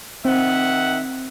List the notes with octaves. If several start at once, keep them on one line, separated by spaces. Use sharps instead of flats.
D#3 C4 E5 F#5